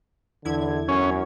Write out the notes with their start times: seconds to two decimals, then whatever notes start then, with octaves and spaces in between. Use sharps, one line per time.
0.45 E2 D3 E4 G#6
0.88 F#2 C#4